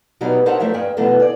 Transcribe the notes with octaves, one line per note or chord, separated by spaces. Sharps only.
B2 F#3 G3 B3 D#4
D4 D#4 A#4 C5 E5 F#5
E2 F3 F#3 A3 A#4 E5
G2 A#3 G#4 G5
B2 D3 E3 F#3 A3 B3
G#4 D5